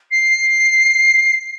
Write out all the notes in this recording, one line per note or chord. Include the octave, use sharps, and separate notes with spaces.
C7